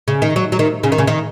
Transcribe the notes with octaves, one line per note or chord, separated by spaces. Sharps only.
C#3
D#3
F#3
F#3
D#3
C#3
D#3
C#3
D#3